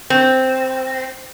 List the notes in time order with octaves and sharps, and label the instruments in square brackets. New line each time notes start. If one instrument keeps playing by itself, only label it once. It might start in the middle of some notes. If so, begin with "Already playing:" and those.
[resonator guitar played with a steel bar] C4